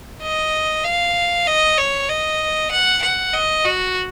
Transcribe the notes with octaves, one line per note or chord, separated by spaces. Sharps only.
D#5
F5
D#5
C#5
D#5
F#5
F#5
D#5
F#4